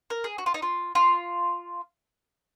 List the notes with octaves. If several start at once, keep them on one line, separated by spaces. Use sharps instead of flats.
A#4
G#4
F#4
F4
D#4
F4
F4